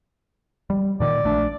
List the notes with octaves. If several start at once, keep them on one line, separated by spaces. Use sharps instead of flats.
G3
A#2 D#3 D5
A#1 A3 D4